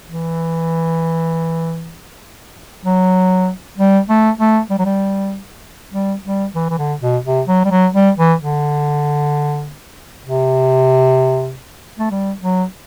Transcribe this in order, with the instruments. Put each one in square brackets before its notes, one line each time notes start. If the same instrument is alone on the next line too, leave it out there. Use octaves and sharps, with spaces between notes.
[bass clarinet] E3
F#3
G3
A3
A3
G3
F#3
G3
G3
G3
E3
E3
D3
B2
C3
F#3
G3
F#3
G3
E3
D3
C3
A3
G3
F#3